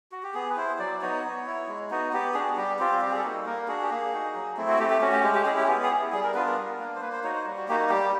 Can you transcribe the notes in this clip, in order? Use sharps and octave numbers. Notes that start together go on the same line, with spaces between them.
F#4
G4
B3 G#4
B4
E4 C5
F#3 D5
B3 D#4 F#4 C#5
B3
E4
G#3
B3 D#4 F#4
B3 G4
D4 F#4 G#4
G3 G4
C4 F4 G4
G3 G4
G#4
A4
A#3 D#4 F#4
A#3 A#4
D4 F#4 G#4
G4
A#3 G#4
D#4 F#4
F#3
A3 C4 E4
F#4
A3 G4
G4
C#4 F#4
G4
G#3 G4
G4
C#4 E4 G#4
G4
B3 G4
G#4
E4
G3 G#4
A#4
B3 D4 F4 B4
A#4
G3
A#3 D4
C5
A#3 B4
C5
D#4 F#4 C#5
C5
G3
F#4
A#3 D#4 F#4 G4
F#4
G3 G4